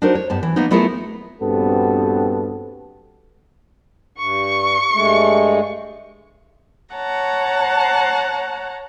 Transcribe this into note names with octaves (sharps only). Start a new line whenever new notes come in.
D4 D#4 F#4 A#4 C5
C#5
G2 B3 A5
E3
F#3 A#3 B3 D#4
A3 B3 E4 F4 G#4 A#4
A#1 G2 B3 C4 F#4 A4
G2 C#6
G2 G#3 A3
C#5 F#5 A5 A#5